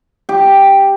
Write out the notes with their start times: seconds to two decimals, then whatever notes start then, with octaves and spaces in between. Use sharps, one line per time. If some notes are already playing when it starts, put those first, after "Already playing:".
0.29 G4